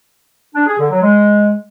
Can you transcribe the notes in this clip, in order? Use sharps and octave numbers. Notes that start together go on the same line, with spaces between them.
D4
G#4
D3
F#3
G#3